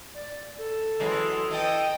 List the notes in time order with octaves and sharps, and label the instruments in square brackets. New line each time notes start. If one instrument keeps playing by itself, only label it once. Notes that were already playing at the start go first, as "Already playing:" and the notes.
[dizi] D5
A4
[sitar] E3 F#3 G#3
[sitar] E3 A4 [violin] D#5 G5